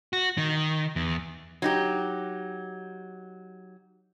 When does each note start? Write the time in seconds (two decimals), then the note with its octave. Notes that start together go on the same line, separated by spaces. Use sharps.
0.13 F#4
0.38 D#3
0.96 E2
1.62 F#3 D#4 G4